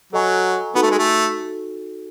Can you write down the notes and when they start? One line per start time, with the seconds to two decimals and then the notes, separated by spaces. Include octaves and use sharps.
0.13 F#3 A4 D#5 G#5 C#6
0.75 B3 D#4 F#4 A4
0.83 A3
0.91 G#3
0.99 A3